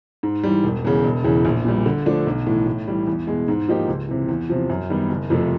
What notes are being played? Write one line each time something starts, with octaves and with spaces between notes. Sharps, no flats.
G#2
E3 G3
E1
E2 C#3
E1
E2 C#3 E3
A#1
A#2 G3
D3
F3 A3 D4
B1
A2 E3
A2
E3 G3
E2
B2 G#3
G#2
F3 A#3 D#4 G4
C#2
C3 E3
E2
C3 F3
F#2
D#3 G3 B3
F#1
F2 C3 F3 A3